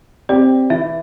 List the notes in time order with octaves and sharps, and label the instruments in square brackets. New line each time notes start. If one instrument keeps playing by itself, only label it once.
[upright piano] C4 G4 [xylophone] D5
[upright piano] E3 [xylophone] E5